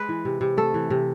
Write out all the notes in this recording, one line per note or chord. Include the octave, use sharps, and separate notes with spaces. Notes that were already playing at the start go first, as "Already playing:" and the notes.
Already playing: G#3 B4
E3
C3
C3
A3 A4
E3
C3